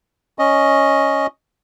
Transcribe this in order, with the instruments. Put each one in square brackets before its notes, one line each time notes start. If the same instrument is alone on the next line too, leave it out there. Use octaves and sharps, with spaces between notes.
[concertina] C#4 D#5